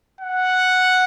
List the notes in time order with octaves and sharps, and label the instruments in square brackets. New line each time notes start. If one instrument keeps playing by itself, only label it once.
[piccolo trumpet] F#5